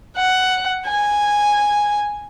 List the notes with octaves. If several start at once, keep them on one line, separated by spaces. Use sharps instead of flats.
F#5
G#5